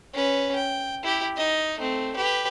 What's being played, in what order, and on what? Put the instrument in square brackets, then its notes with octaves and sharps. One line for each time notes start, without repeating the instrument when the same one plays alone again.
[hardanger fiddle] C#4 B4
G5
E4 G4
D#4 D#5
A3 C4
G4 B4